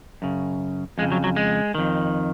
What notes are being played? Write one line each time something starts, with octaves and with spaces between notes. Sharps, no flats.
F#2 C#3
F2 C#3 G#3
F#3
F#3
G#3
F2 D#3